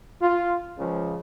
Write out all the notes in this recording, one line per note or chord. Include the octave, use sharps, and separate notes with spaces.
F4
C#2 C#3 F3